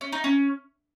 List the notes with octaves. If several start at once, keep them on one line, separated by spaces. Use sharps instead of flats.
C#4
D#4
C#4